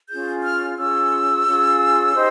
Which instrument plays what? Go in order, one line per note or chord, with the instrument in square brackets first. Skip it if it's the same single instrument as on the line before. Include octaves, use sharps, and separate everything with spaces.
[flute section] C#4 F4 G#4 G6
F6
C#4 F4 G#4 E6
C#4 F4 G#4
D#4 G4 C5